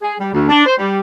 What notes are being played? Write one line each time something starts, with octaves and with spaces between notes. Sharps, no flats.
G#4
G3
D2
D4
C5
G3